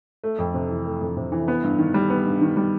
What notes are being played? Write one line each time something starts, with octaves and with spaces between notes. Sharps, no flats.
A3
F2
C3
E3
A3
F2
C3
E3
B3
G2
D#3
G3
B3
G2
D#3
G3